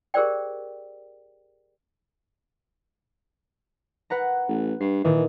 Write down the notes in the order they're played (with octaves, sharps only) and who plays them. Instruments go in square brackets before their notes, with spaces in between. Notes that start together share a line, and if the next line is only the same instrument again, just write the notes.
[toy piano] G4 G#4 A#4 C5 D5 G5
[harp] B4 F#5 A#5
[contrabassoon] A1
[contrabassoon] G2 [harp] C7
[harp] A#2 D#3 [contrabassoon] E3